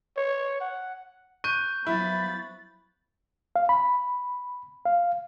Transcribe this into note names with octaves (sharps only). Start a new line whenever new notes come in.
C#5
F#5
C#6 F#6 G6 D#7
F3 F#3 B3 E4 B5 A6
F5
B5
F5